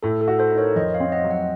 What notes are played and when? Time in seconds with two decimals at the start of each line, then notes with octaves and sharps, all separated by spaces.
0.03 A2 A4
0.21 A4
0.28 F#4
0.39 A4 C5
0.52 D#4
0.58 A#4 C#5
0.76 F2 C5 D#5
0.94 C#5 F5
1.00 C4
1.12 D#5 F#5
1.24 F#3
1.30 D#5 F#5